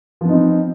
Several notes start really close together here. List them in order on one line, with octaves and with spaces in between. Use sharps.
F3 B3 D#4 C4